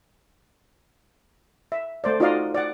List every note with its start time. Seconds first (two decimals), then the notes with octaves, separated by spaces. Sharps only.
1.72 E5
2.04 A3 C5 D5
2.20 D#4 F4 F#4 D5 D#5 F5
2.55 D5 F#5